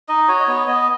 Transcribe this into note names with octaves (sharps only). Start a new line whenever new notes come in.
D#4 D#5
F#4 C#5
D#5
B3 C#5
B3 D#5